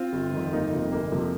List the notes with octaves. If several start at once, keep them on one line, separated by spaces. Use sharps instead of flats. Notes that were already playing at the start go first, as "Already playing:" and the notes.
Already playing: C4 F4
G1
F2 D#3
G1 A#3 D#4
F2 C3 F3
G1 A#3
F2 C3 F3